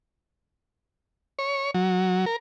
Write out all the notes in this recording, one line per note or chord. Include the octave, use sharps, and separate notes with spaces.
C#5
F#3
A#4